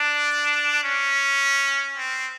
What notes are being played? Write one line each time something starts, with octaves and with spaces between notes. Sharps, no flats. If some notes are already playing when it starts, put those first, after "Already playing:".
Already playing: D4
C#4
C4